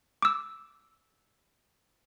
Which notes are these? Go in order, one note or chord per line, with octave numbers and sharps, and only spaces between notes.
D6 E6